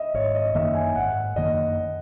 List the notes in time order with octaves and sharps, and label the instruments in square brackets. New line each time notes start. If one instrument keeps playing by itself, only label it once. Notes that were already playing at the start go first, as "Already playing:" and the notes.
Already playing: [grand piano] D#5 E5
[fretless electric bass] G#1 [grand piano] C#5
[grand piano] D#5
[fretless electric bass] F#2 D#3 A#3 [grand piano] E5
[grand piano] G#5
[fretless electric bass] G#1 [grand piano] F#5
[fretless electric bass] F#2 D#3 A#3 [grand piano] D#5